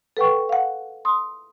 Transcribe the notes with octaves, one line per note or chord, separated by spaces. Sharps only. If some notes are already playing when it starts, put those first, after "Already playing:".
A4 B4 F#5 G5 C#6
F5 F#5
C6 D#6